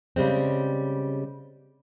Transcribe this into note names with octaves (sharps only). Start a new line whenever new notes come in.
C#3 G3 G#3 C4